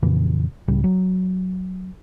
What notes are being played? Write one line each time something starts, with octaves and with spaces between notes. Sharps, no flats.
F2 A#2 C#3 E3
C#2 A2 C#3 G3
F#3